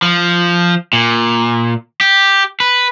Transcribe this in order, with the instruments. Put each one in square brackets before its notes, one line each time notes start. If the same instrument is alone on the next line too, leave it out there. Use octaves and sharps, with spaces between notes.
[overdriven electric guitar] F3
A#2
G4
B4